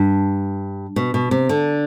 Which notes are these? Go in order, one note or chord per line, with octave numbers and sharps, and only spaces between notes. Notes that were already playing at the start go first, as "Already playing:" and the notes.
Already playing: G2
B2
B2
C3
D3